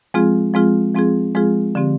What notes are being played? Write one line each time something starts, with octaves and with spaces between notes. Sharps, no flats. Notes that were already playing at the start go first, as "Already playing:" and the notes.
F3 G#3 C4 F4 G#4
F3 G#3 C4 F4 G#4
F3 G#3 C4 F4 G#4
F3 G#3 C4 F4 G#4
D3 F3 C4 G4